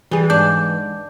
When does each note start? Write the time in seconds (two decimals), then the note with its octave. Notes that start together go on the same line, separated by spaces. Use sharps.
0.11 E3 G3 G#4
0.30 G#2 D4 D6 G6